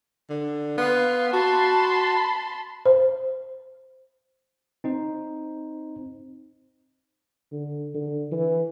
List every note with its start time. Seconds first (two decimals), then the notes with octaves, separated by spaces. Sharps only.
0.30 D3
0.78 B3 F5 C6
1.33 F#4 A5 B5 C6
2.86 C5
4.84 C4 D#4 C5
7.52 D3
7.95 D3
8.32 E3